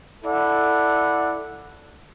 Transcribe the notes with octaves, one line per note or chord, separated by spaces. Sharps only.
E4 A4 D5 F#5